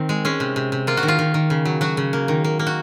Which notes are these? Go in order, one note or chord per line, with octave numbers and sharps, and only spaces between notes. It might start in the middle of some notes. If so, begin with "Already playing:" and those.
Already playing: D#3 C4
G#3
G#3 C#4
C3
C3
C3
A#3 F4
F#4
D#3
F4
D#3
D#3
C#3
F#3
F#3 F#4
C#3
A#3
D#3
A#3
A#3
F#4